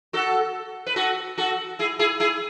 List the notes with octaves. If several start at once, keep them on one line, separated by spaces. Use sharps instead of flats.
F#4 A4
B4
F#4 A4
F#4 A4
E4 G#4
E4 G#4
E4 G#4